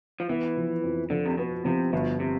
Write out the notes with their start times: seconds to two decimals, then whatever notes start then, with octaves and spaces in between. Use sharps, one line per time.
0.20 F3
0.29 E3 B3
0.57 F3
0.84 F2
1.10 D3 F3
1.26 C3
1.37 B2 B3
1.65 C3 F3
1.93 G1 B2
2.20 C3